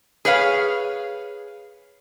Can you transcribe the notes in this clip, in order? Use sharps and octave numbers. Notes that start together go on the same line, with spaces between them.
G#4 B4 C#5 F5